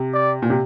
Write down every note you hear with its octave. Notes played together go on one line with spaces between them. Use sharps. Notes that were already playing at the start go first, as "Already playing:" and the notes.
Already playing: C3
D5
A#2
C3